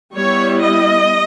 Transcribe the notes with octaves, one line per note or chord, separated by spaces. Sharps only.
G3 B3 E4 C#5
D#5